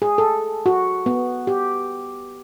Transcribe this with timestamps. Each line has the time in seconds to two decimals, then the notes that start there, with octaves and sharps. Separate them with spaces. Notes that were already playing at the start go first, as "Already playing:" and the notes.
0.02 G#4
0.18 A4
0.66 F#4
1.06 B3
1.47 G4